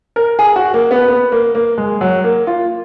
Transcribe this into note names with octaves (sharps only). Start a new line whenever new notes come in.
A#4
G#4
F#4
A#3
B3
B3
A#3
A#3
G#3
F#3
A#3
F4